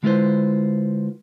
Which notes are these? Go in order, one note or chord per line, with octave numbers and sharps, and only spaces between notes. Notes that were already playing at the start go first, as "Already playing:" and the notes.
D3 G#3 E4 F4 B4 C5